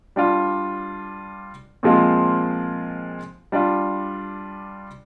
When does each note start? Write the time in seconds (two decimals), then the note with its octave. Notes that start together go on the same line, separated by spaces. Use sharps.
0.16 G3 D4 F4
1.83 A#2 F3 G#3 C4 F4
3.52 G3 D4 F4